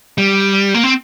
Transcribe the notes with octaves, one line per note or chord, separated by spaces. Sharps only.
G3
A#3
C4